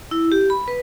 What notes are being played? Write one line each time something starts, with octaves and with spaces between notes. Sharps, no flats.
E4
G4
B5
B4